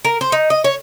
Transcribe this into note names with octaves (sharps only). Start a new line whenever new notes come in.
A#4
C5
D#4
D#5
C#5